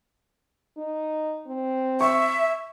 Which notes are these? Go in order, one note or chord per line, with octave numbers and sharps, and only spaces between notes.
D#4
C4
E5 C#6